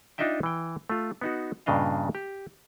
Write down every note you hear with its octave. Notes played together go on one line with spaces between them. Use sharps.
D4 D#4 F4 D#5 E5 G5
E3 G5
A3 F4
B3 D#4 F#4
G2 A#2 C#3 D4 D#5 F5
G4